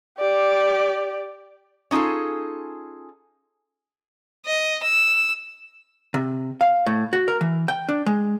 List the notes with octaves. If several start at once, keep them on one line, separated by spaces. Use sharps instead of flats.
G4 D5
C#4 D#4 F4 G#4 A4
D#5
E6
C3
F5
A2
F#4
A#4
E3
G5
D4
G#3